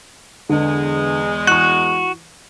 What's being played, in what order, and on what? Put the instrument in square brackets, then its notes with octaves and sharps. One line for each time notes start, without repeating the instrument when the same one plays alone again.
[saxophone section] E2 G#3 [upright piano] D3
[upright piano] E3 C#6 [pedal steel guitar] F#4 [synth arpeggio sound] F#6